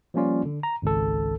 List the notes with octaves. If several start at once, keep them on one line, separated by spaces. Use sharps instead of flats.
F3 G3 A#3 C#4 F4 D5
D3
A#5
G#1 C#2 A4